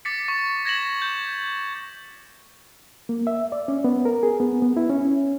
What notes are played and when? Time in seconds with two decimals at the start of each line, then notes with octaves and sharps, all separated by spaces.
0.05 D6 A6 B6 C#7
0.28 C#6 A6
0.65 G#6 A#6 E7 F#7
1.02 G6
3.09 A#3
3.27 E5
3.52 D5
3.68 C#4
3.84 B3
4.05 A#4
4.23 G#4
4.40 B3
4.62 B3
4.77 E4
4.90 C#4